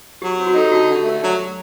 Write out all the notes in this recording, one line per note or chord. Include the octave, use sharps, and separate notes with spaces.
F#3 G4
C4
F#4
D#4 A4
G4
D3 F#4
F#4
D3
G4
A3 A#4
F#3
F#3